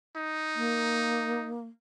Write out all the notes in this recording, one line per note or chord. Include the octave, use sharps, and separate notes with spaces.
D#4
A#3